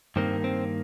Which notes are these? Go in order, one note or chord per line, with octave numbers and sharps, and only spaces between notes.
G2 D#3 A#3 C4
C4